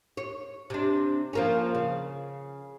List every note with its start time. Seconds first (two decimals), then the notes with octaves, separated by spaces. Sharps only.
0.17 C#5
0.70 C3 D4
1.33 F3 A#3 C#4
1.75 C#3